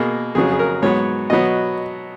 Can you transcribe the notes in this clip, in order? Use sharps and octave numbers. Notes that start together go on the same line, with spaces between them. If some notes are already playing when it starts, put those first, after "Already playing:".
Already playing: B2 A#3 G#4
F2 C#3 F#3 G#4
G#4
A#4
G#2 F#3 B3 C#5
B2 F#3 B3 D#5